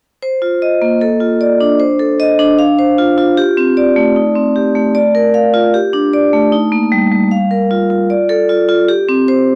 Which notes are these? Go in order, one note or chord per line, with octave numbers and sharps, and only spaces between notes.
C5
F4
D#5
A#3
A4
F4
D5
D4
C5
A4
D#5
D4
F5
C5
F4
F4
G4
C4
D5
A3
D#4
C4
G4
A3
D5
A#4
F5
F4
G4
D4
D5
A3
D#4
A#3
G3
G3
F5
A#4
F4
F4
D5
A4
F4
F4
G4
C4
C5